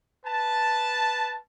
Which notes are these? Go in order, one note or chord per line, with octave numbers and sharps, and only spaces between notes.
B4 A5